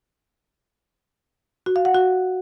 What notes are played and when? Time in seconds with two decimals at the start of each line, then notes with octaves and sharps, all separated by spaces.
1.66 F#4
1.76 F5
1.85 F#5
1.94 F#4